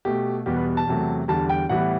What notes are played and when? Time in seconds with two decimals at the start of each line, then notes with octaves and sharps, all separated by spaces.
0.05 B2 A3 G4
0.46 E2 B2 G3 B3 G4
0.56 B4
0.77 A5
0.87 E2 C3 F#3 A3
1.28 E2 D3 G3 A5
1.49 G5
1.69 A2 E3 G3 B3 F#5